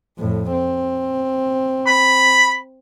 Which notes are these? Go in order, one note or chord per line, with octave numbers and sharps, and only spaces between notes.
F2 A2
C4
B5